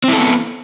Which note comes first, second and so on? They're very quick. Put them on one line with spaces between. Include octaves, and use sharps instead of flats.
C4 E4 A4 B3